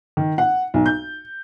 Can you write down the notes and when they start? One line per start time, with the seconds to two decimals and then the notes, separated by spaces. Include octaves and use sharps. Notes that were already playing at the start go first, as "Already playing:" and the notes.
0.17 D#3
0.38 F#5
0.74 B1
0.86 G6